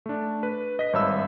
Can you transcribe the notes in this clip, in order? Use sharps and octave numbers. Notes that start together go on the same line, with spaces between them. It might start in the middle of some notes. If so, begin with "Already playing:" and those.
A3 D4
B4
D#5 B6
G#1 G2 C#5 E5 B5 E6